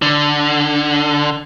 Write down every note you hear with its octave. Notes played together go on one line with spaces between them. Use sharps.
D3